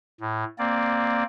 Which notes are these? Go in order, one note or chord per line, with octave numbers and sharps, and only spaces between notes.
A2
A#3 C4 D5